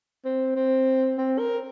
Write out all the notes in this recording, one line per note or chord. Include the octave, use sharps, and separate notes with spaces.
C4
C4
C4
A#4